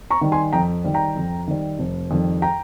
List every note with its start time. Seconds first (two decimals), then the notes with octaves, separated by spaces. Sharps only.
0.11 A#5 C#6
0.21 D#3 G3
0.32 G#5 C6
0.53 F2 G5 A#5
0.84 D#3 G3
0.94 G5 A#5
1.16 F2
1.48 D#3 G3
1.79 F1
2.11 F2 D#3 G3
2.42 G5 A#5